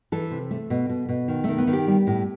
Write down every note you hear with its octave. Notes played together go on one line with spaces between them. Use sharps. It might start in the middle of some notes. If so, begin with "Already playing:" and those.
E3 A4
C3
A3
B2
B2
B2
D#3
D#3 A3
B3
D#3
G4
G3
A2